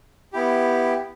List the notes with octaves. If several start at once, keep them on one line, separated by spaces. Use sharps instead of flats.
B3 E4 G4